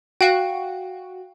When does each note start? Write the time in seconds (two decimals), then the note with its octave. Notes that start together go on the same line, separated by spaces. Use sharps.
0.21 F#4 F5 G5